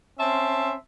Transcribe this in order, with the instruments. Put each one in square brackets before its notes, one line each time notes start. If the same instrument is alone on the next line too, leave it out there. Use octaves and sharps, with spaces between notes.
[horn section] C4 C#4 E5 A5 C6